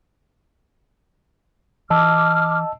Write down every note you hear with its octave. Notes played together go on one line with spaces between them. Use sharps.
E3 D#5 A5 D6 E6 F6